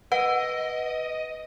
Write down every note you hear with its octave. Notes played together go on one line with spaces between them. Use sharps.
B4 D#5 F#5